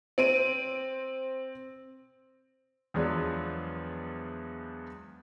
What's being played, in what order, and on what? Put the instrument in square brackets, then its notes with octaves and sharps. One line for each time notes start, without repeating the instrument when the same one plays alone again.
[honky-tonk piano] C4 D7 D#7
[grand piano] E2 F3 F#3 G#3 B3 D4